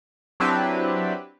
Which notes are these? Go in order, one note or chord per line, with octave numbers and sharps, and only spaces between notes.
F#3 C4 D4 E4 G4 B4